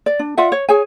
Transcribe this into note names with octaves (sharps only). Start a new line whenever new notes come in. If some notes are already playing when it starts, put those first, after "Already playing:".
D5
D4
F4 D5 E5 F#5
C#5
G#4 C#5 G#5